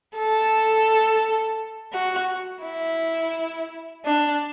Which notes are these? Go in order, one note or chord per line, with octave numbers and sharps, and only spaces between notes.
A4
F#4
E4
D4